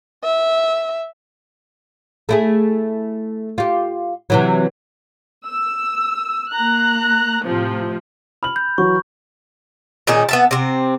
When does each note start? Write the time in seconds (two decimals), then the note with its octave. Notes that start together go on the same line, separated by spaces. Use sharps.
0.24 E5
2.29 A3 E4 G#4
3.58 F4 G4
4.30 C3 E3 F#3
5.46 E6
6.54 A#3 A#5 F#6
7.45 A2 C3 F3
8.43 B5 F6 F#7
8.56 G6
8.78 E3 F#3 C#6
10.07 A#2 D#3 C#4 G#4
10.29 B3 E5 A5
10.51 C3 C4